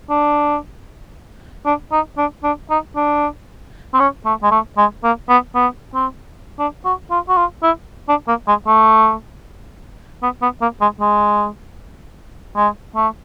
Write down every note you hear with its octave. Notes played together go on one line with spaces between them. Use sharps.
D4
D4
D#4
D4
D4
D#4
D4
C4
C#4
A3
G#3
A3
G#3
A#3
B3
B3
C4
D4
F#4
F4
F#4
F4
E4
D4
A#3
G#3
A3
B3
B3
A#3
G#3
G#3
G#3
A3